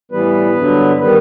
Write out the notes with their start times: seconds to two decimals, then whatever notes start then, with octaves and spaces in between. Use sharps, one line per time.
0.12 A2 E3 G3 B3 B4
0.57 G2 D3 F#3
1.01 D#3 G3 B3 B4